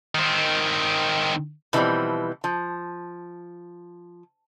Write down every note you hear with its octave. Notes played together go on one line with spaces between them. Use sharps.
D#3 C4
B2 E3 F3 G3 C4
F3